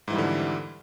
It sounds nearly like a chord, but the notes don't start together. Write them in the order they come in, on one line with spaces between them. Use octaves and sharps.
G#2 E3 G3 F2 D3